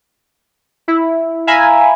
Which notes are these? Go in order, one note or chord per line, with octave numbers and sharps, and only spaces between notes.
E4
E5 F5 G#5 A#5 B5